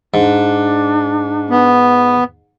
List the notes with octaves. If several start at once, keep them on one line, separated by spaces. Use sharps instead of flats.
G#2 D4
B3